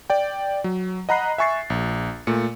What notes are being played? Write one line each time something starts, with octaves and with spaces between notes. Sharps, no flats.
D5 G5
F#3
D#5 F#5 A#5 B5 F#6 C7
E5 G#5 C#6 A6 C7
A#1
A#2 A3 C#7